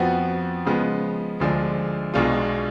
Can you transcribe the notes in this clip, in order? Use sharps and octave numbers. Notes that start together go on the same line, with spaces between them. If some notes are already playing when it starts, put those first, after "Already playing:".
Already playing: F2 F3 B3 F#4
C#3 F3 G#3 B3
D2 D3 F3 G#3 D4
B1 B2 G#3 D4 F4